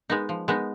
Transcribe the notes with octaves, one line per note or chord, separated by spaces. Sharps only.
G#3 B3 D#4
F3
G#3 B3 D#4